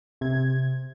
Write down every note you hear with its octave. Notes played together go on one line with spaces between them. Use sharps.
C3 G#6